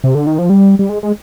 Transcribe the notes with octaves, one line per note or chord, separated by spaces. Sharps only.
C3
D3
D#3
F3
G3
G3
G#3
G#3